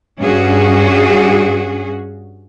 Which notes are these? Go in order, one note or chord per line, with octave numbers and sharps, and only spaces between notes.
G2 C#4 F#4 G#4